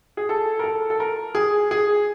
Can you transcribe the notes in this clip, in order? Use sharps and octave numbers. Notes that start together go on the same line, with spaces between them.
G#4
A4
A#4
A4
A4
A#4
G#4
G#4